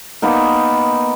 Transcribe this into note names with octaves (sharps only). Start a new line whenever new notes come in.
A#3 B3 D#4 A#4